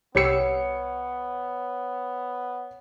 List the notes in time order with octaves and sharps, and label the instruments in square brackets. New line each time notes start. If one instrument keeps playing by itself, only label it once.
[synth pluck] C2 G4 E6 [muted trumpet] B3 [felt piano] C#5 C#7